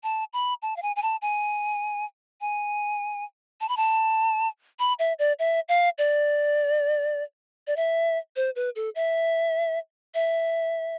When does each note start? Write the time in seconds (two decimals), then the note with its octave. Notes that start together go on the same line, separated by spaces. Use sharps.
0.03 A5
0.33 B5
0.62 A5
0.77 F5
0.82 G#5
0.96 G#5
1.02 A5
1.22 G#5
2.41 G#5
3.61 A5
3.69 B5
3.77 A5
4.79 B5
4.99 E5
5.19 D5
5.39 E5
5.69 F5
5.98 D5
7.67 D5
7.76 E5
8.36 C5
8.56 B4
8.76 A4
8.95 E5
10.15 E5